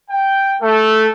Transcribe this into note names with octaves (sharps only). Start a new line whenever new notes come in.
G5
A3